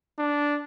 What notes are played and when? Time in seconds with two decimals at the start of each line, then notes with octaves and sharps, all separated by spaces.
0.19 D4